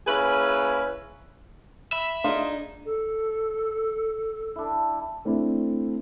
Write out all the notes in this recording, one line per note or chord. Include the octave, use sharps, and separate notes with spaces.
A#3 C#4 E4 G#4 B4
E5 B5
D4 D#4 F4 G#4 D5
A4
D4 E4
A3 C4 D4 E4